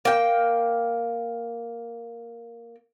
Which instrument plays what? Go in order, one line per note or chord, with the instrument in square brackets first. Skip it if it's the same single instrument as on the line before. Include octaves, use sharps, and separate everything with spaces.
[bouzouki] A#3 G5